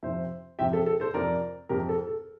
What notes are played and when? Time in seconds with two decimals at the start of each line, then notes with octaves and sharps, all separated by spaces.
0.03 F2 C3 F3 C5 E5
0.59 F2 C3 F3 E5 G5
0.73 A4
0.86 A4
1.00 A4 C5
1.14 F2 C3 F3 A#4 D5
1.69 F2 C3 F3 G4 A#4
1.89 A4
2.07 A4